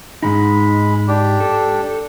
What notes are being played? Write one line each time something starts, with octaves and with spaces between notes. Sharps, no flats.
G#2 C3 G#3 D#4 B5
D4 G4
A4